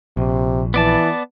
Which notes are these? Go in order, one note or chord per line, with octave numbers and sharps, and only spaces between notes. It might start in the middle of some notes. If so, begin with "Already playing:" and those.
A#1 C3
E3 B3 D5 A5